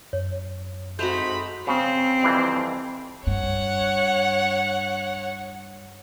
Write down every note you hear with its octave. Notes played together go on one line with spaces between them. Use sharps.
F#2 C#5
G#2 A3 C4 D#4 F#4 B5 G6 F7
C#3 C4
F2 E3 G3
G2 C#5 F#5